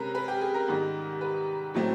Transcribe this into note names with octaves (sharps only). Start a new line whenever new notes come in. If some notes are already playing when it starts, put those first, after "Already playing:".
Already playing: C3 G#3 C#4 A#4 B4
B4
G4
G#4
A#4
G#2 D#3 G3 B3
B4
A2 F#3 A3 C4